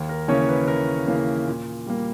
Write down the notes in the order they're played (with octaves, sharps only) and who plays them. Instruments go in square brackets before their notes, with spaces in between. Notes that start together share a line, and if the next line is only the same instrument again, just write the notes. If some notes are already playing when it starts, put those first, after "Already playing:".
Already playing: [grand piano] D#2
A#4
C#3 E3 A#3 C#4 C#5
B4
D#2 A#4
C#3 E3 A#3 C#4
A#2
G3 A#3